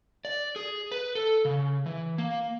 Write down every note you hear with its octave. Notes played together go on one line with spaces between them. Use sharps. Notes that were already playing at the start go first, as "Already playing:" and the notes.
D5
G#4
B4
A4
C#3
E3
A#3